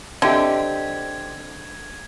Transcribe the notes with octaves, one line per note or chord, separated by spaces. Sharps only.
D3 C4 G4 D#5 E5 G#6